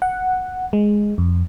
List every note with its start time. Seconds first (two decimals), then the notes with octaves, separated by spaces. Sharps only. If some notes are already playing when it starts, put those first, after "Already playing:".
0.02 F#5
0.73 G#3
1.18 F2